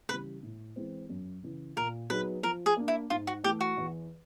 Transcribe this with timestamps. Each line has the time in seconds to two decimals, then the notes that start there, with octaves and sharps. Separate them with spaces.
0.09 C#3 E3 G3 B4
0.43 A2
0.76 E3 G#3 C4
1.09 F#2
1.43 C#3 E3
1.76 A#2 A#4
2.10 F#3 B3 D#4 G#4 B4
2.43 F3 A#4
2.66 G#4
2.77 A#3 D4
2.88 E4
3.10 G#2 F4
3.27 F#4
3.44 E3 A3 G4
3.60 F#4
3.77 E2